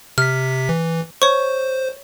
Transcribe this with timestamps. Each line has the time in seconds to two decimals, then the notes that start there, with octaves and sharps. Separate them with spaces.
0.18 C3 F6 B6
0.69 E3
1.22 C5 C#5 C#6